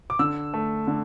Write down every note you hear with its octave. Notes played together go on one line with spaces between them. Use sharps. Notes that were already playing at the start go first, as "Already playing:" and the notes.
D6
D3 E6
A3
D3